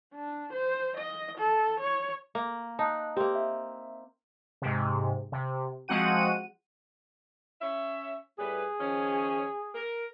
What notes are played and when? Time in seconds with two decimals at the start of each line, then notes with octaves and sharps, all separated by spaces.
0.14 D4
0.53 C5
0.97 D#5
1.38 A4
1.80 C#5
2.35 A#3
2.79 D#4 A5 A#5 F#6
3.16 A#3 C4 G4
3.35 E5
4.62 G#2 C3
5.32 C3
5.88 F3 G#3 C4 F#4 F#5 D#7
7.61 C#4 E5
8.39 A2 G3 G#4 B4
8.80 D#3 F3 C#4
9.75 A#4